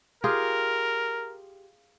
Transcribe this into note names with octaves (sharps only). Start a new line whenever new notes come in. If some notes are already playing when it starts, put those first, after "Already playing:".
F4 G4 G#4 A#4